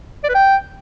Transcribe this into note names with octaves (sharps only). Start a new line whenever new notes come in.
D5
B4
G5